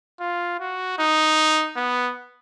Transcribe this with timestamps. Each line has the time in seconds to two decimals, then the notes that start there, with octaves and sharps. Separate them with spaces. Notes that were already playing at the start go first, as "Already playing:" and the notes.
0.20 F4
0.60 F#4
0.99 D#4
1.76 B3